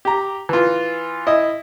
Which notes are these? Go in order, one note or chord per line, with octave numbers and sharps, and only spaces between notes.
G4 A#5
E3 F4
E4 D#5